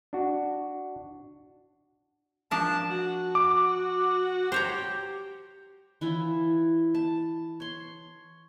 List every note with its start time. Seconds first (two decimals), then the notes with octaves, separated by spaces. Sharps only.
0.13 D4 F#4
2.51 F3 D4 A#4 A5
2.90 F#4
3.35 D6
4.52 G4 C5 C#5 A#5
6.01 E3 E4 F4 C#5
6.95 A5
7.60 C#5 C6